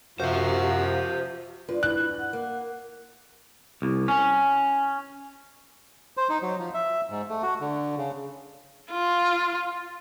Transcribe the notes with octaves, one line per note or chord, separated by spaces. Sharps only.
F#2 C3 F3 F#4 C5 E5 F5
G2 F4 B4
E4 F#6
F#5
A#3
C2
C#4
C5
D#4
F#3
F3
E5
G#2
A3
F#4
D3
C#3
F4